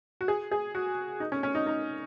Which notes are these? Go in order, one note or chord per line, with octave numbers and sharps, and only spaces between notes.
F#4
G#4
G#4
F#4
D#4
C#4
C#4
D#4
D#4